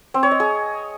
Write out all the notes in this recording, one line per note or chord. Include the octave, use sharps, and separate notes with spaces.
C4
C#5
D#5
G#4